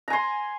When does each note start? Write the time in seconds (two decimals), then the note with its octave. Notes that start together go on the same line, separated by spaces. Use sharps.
0.08 A#5
0.10 G#5
0.13 C6